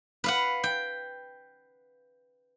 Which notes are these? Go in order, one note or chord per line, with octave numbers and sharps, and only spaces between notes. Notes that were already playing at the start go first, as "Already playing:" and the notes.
B4 F5 F#5
G5